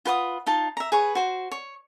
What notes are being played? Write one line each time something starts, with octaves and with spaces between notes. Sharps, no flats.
F4 B4 F#5 D#6
D#4 F4 A5
E5 A#5
G#4 B4 C#5
F#4 C5
C#5